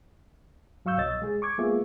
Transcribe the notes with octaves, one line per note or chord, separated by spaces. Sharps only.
G2 F#3 F5 C#6 E6 G6
C2 B2 C#5 D#5 E6 A6
G#3 G#4
C#6 D6 G#6
G#3 A#3 B3 F4 G#4 E5